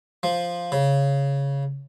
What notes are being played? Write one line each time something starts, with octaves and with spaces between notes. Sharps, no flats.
F3
C#3